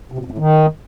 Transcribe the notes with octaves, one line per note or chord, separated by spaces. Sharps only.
C3
B2
F2
A2
D#3